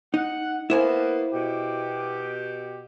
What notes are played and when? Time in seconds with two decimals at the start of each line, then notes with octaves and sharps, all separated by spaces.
0.14 D#4 F#5
0.70 A#3 B3 E4 C5 G#5
1.33 B2 G4